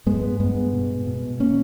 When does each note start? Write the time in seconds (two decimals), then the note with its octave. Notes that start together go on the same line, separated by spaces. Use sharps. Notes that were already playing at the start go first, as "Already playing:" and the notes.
0.06 G2 G#3 B3
0.40 G2 G#3 B3
0.73 B2
1.07 B2
1.40 A#3 C#4